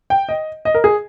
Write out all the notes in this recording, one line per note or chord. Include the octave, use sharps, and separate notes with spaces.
G5
D#5
D#5
A#4
G#4